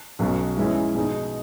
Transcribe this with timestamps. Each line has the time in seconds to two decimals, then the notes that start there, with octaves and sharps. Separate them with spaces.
0.19 B1 B2 F#3 C#4
0.57 G#2 E3 G#3 C#4 E4
0.95 B2 G#3 D#4